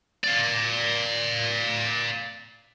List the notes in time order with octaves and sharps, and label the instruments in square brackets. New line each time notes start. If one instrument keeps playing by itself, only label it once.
[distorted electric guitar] D5 F5